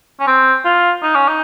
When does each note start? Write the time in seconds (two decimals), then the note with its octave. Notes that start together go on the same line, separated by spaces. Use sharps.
0.20 C#4
0.27 C4
0.65 F4
1.02 D#4
1.15 C#4
1.28 D#4